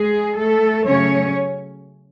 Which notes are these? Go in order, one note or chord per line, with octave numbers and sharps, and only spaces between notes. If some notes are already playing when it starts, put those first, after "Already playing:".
Already playing: G#3 G#4
A3 A4
C#3 F#3 A3 C#4 C#5